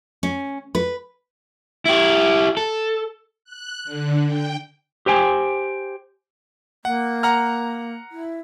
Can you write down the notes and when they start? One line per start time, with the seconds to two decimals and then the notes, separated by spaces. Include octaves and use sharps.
0.23 C#4
0.75 B4
1.86 E4 G4
2.57 A4
3.45 F#6
3.84 D3
4.25 G5
5.06 G4 C5 G5 G#5
6.85 A#3 F#5
7.23 F#5 A#5 F6
8.12 E4